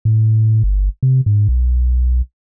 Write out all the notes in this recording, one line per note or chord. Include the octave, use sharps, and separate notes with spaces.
A2
G1
C3
G#2
B1